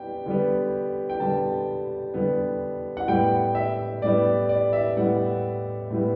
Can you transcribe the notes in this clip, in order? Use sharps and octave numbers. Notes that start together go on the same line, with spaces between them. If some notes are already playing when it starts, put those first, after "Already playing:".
Already playing: G3 B3 G5
D3 G3 B3
G5
D3 G3 B3 A5
D3 G3 B3
F#5
A2 G3 B3 G5
E5
A2 G3 B3 D5
D5
E5
A2 G3 B3 F#5
A2 G3 B3